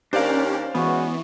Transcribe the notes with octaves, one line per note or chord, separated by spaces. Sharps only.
D#2 C#4 D4 G4 A#4 C5 D5 F5
E3 G#3 B3 C#4 F#4